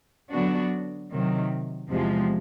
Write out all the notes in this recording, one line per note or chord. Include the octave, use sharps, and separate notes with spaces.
D3 F#3 B3 D4 F#4
C3 D#3 F#3
E2 C3 F3 G#3